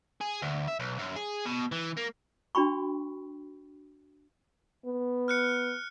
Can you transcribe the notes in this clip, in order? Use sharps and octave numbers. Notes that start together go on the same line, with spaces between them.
G#4
D2
E5
B1
F#2
G#4
B2
E3
A#3
D4 F#4 G5 B5 C#6
B3
F6 F#6 C#7